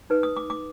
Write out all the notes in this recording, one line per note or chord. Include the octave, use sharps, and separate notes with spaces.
D#4 B4
D#6
D6
D6